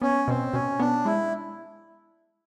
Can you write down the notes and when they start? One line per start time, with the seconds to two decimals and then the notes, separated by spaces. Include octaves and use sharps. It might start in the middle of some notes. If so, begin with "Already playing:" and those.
0.02 B3 C#4
0.28 B2 C4
0.53 B2 C#4
0.79 B3 D4
1.05 G#3 E4